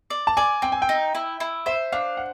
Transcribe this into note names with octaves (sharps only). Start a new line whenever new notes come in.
D5
A5
D5 G#5
C4 G5
G#5
G5
D#4
E4
E4
C5 E5
D4 F5
F#5